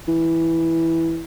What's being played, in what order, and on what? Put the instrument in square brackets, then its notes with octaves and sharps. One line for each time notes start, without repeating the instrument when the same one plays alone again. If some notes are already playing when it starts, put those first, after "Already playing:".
[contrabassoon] E3